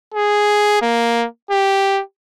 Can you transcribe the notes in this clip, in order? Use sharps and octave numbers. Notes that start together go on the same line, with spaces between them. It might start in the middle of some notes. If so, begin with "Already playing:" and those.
G#4
A#3
G4